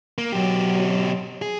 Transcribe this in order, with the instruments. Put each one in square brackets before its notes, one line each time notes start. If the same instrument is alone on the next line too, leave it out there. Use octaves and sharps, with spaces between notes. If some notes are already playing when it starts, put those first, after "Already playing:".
[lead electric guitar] A#3
[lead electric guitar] B2 G4 [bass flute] F#3
[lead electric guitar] G#4